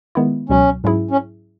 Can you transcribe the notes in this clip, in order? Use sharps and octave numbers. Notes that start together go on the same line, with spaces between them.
D#3 G#3 B3 E4
C#2 B2 F#3 C#4
G#2 F#3 C#4 E4 G#4
C#4